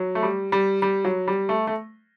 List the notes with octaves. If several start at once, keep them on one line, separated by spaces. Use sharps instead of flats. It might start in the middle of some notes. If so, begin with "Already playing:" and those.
Already playing: F#3
A3
G3
G3
G3
F#3
G3
A3
A3